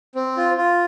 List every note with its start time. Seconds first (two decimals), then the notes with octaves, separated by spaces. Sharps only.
0.15 C4
0.37 F4
0.57 F4